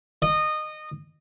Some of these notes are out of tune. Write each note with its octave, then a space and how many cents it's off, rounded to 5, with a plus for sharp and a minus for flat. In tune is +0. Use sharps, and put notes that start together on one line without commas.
D#5 -20